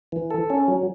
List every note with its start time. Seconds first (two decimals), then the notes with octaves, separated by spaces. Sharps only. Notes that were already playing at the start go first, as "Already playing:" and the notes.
0.12 E3
0.31 A4
0.50 C#4
0.68 F#3